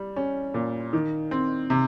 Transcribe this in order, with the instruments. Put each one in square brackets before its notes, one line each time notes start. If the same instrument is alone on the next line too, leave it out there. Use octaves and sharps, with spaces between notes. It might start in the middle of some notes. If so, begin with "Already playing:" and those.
Already playing: [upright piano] G3
C#4
A#2
D#3
C4
C3